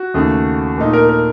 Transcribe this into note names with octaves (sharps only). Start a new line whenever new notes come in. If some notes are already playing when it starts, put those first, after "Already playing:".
Already playing: F#4
D#2 C#3 A3
A#2 A3 D#4
A#4
A#4